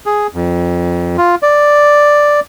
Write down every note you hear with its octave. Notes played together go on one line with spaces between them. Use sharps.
G#4
F2
F4
D5